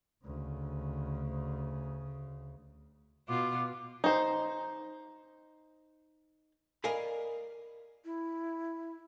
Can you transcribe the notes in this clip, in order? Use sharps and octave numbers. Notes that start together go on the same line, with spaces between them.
D2 C#3
B2 F4 D6
D#4 C5
A#4 D5 D#5 F5 G#5 B5
E4